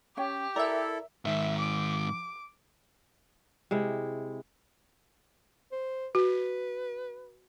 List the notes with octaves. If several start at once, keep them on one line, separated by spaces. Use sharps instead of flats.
C#4 G4 C#5 G5
E4 A4 A#4 D5 E5
G#2 D#3 E5
D6
C3 G#3 E4
C5
F#4 B4